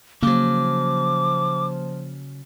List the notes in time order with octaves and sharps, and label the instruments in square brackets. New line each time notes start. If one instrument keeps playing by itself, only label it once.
[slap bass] C#3 F#3 [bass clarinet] F3 [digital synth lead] A#3 [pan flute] D6